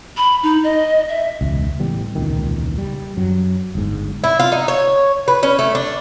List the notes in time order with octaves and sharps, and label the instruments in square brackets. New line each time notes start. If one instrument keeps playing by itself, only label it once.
[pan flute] B5
D#4
D#5
E5
[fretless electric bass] E1 C#2
A1 E3 G3 B3
E1 C#2 A#2 D#3
G3
F#2 F#3
G1 G#2
[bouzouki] E4
F4
D#4
C#5
B4
C#4
A3
D4